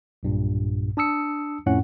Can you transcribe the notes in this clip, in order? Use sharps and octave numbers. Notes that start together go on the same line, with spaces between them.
B1 G2 A#2
D4 A5 D#6 E6 C#7
F2 A2 C#4 F#5